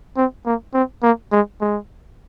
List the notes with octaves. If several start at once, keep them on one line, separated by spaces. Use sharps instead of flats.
C4
A#3
C4
A#3
G#3
G#3